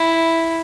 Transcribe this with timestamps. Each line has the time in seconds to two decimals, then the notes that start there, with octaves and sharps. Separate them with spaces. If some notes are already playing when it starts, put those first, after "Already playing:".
Already playing: E4